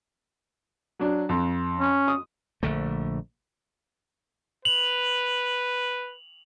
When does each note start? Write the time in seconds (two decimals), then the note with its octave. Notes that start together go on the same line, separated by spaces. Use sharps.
0.99 F#3 D4
1.29 F2
1.78 C#4
2.08 D#6
2.63 A#1 D3 A3
4.65 B4 F7 F#7